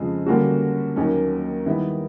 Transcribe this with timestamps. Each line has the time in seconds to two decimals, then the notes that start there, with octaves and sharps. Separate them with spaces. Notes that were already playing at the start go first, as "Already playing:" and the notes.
Already playing: F2 C#3 F3 G#3
0.26 D3 G3 A#3 C#4 F#4
0.96 D#2 D#3 F#3 A#3 C#4
1.66 D#3 G3 B3 E4